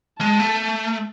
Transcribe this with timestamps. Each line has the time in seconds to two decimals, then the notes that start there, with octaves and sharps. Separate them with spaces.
0.21 G#3 A5
0.39 A3